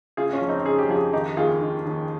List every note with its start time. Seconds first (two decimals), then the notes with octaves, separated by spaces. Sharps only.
0.17 C#3 F4 G#4
0.33 C#4 F4
0.42 F2
0.49 C4 D#4
0.65 C#3 G#4
0.79 G4
0.89 F2 F4 G#4
1.13 D#3 D#4 G4
1.37 D#2 F4 G#4
1.61 D#3
1.85 D#2